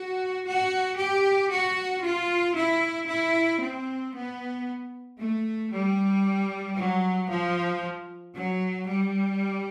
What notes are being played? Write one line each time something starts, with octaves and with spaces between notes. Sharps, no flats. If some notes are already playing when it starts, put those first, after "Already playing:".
Already playing: F#4
F#4
G4
F#4
F4
E4
E4
C4
B3
A3
G3
F#3
F3
F#3
G3